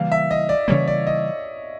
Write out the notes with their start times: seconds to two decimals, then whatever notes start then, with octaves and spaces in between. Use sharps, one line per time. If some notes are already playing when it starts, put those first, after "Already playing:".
Already playing: C#3 E3 G3 A#3 F5
0.12 E5
0.31 D#5
0.49 D5
0.68 C#3 E3 G3 A#3 C#5
0.88 D5
1.07 D#5